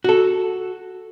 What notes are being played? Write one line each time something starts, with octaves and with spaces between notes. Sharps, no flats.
F#4 A4